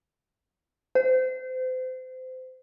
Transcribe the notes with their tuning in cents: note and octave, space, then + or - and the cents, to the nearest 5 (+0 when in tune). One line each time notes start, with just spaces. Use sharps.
C5 -30